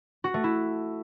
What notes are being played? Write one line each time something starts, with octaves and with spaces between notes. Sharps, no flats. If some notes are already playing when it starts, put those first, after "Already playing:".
F#4
A3
E4